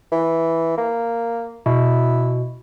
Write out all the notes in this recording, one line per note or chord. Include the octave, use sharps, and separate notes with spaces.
E3
A#3
B2 E4